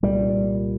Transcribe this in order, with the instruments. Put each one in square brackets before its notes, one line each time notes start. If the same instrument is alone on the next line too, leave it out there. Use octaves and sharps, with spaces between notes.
[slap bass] C2 A#2 G3